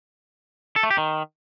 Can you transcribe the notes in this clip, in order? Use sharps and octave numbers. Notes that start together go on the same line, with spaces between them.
A4
A3
G4
D#3